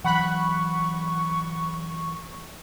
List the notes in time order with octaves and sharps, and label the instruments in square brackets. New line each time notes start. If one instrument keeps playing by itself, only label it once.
[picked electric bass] E3 F#3 [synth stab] F#5 B5 F#6 [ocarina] C#6